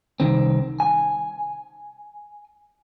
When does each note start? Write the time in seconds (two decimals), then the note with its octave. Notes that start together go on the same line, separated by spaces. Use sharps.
0.20 C2 F2 D#3 C4
0.80 G#5